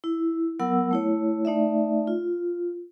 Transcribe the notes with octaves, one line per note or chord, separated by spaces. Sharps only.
E4
F#3 B3 A#4 F#5 E6
A3 E4 C#5
A3 D#4 D5 E5
F4